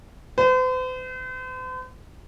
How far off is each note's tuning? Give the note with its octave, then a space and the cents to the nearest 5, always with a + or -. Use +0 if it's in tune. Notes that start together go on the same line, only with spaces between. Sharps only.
C5 -45